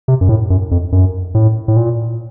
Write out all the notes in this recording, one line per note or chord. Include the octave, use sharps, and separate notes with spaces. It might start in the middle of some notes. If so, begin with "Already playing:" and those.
C3
F#2
A2
F#2
F2
F#2
A2
A2
A#2